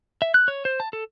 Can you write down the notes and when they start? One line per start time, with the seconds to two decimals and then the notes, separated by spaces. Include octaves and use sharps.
0.22 E5
0.34 F#6
0.48 C#5
0.65 C5
0.80 A5
0.93 A4